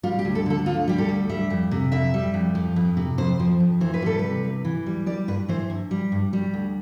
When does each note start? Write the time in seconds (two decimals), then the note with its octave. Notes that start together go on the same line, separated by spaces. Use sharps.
0.03 G3 F4
0.19 G4
0.25 D2
0.35 A4
0.46 D3 A4
0.66 D2 F4
0.88 G3 G4
0.98 A4
1.09 D2
1.29 G3 E5
1.50 F2
1.71 C3
1.92 F2 E5
2.14 G3
2.34 F2
2.55 F3
2.76 F2
2.97 C3
3.18 F2 C5
3.40 F3
3.60 F2
3.81 E3 C5
3.94 B4
4.02 G3 A4
4.19 C3 B4
4.44 E2
4.65 E3
4.86 G3
5.06 G3 D5
5.28 G2 B4
5.48 E3 C5
5.70 G2
5.91 G3
6.12 G2
6.33 G3
6.54 D2